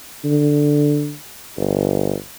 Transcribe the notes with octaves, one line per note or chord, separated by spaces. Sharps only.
D3
G1